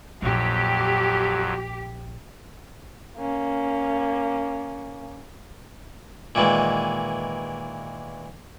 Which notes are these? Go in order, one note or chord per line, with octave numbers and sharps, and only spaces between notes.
A#1 F2 F#3 G4
A#3 C#4
A#2 D#3 E3 G#3